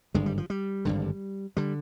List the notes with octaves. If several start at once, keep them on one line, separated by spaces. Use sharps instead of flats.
G#1 G2 D3 G#3
G3
F3
G3
G#1 G2 D3
D3 G3